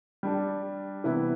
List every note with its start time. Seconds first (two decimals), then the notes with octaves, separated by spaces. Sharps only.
0.23 G3 D4 G4
1.04 C3 E3 B3 E4 B4